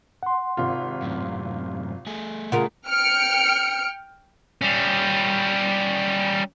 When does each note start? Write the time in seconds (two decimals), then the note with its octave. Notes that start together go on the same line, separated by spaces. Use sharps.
0.23 F#5 C6
0.57 G#1 C3 F4
1.02 F#2 A2
2.07 A3 G#4
2.52 C#3 F4 A#4 F#5
2.88 G5 F6 C#7 D7
4.61 G3 C#4